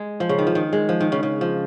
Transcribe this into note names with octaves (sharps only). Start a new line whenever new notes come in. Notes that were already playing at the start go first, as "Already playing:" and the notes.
Already playing: G#3
F3
C#3
D#3
F3
D#3
G#3
F3
D#3
C#3
C#3
F3